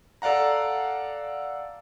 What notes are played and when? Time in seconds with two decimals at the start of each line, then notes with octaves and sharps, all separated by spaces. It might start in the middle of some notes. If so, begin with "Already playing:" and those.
0.22 A4 D5 F5 F#5 A#5